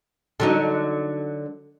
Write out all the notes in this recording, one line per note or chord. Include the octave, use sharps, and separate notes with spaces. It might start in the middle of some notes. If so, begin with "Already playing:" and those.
D3 F#3 D#4